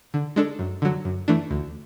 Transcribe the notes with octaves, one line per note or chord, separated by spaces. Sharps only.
D3
G#3 D4 A4
F#2
D3 F#3
F#2
E3 A3 D4
D2